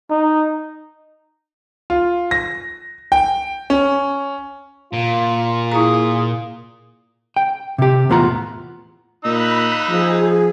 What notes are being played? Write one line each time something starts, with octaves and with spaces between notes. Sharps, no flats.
D#4
F4
A#6
G5
C#4
A#2 F4
E4 G#4 A#5
G5
C3 G4
E2 A2 B3 F4 B4 A#5
A#2 D#4 B5 E6 F#6
F3 G#4